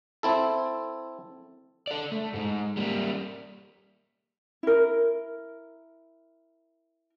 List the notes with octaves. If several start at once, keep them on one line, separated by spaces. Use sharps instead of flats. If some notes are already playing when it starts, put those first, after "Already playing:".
C4 E4 A4
A4 D5
A3
G#2 G#3
G3 A#3
E4 A#4